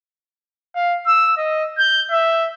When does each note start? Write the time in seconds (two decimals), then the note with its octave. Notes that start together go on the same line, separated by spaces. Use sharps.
0.75 F5
1.06 E6
1.37 D#5
1.78 G6
2.11 E5